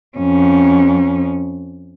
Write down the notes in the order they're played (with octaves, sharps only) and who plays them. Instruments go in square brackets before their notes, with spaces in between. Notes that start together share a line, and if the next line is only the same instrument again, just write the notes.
[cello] F2 C#4